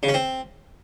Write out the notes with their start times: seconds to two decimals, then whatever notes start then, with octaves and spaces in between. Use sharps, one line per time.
0.03 C#3
0.09 C#4
0.14 C4